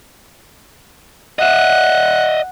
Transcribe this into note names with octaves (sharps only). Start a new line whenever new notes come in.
D#5 E5 F#5